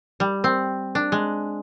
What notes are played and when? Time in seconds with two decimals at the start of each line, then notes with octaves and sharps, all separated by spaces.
0.20 G3
0.44 C4
0.95 D4
1.12 G#3